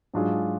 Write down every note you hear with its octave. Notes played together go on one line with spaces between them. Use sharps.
G#2 F#3 D4 F4 G#4